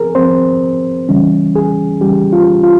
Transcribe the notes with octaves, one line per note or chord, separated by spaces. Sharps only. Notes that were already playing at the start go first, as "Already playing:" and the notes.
Already playing: F3 C4 G#4 A#4
F3 C4 C5
C#3 E3 G3 C#4
G#4
C#3 E3 G3 C#4 G4
F4
F4